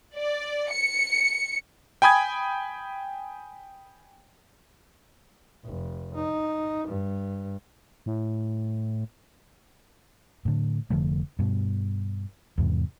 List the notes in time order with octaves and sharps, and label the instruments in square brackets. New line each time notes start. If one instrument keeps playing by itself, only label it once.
[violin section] D5
C#7
[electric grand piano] G5 G#5 B5 D#6 G#6
[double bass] F1
D#4
G2
[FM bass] A2
[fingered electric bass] A2 D3
F1 D3 F3 A3
G2 B2
E2 G#2 C3